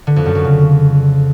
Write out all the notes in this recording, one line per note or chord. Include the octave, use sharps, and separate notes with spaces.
D3
F2
F#2
F2
C#3